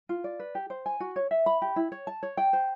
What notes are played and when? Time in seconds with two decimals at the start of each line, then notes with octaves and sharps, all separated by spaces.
0.09 F4
0.24 D5
0.40 B4
0.55 G4
0.70 C5
0.86 G#5
1.00 F#4
1.16 C#5
1.31 E5
1.46 B5
1.62 G4
1.76 E4
1.92 C#5
2.07 A5
2.23 C#5
2.37 G5
2.53 C5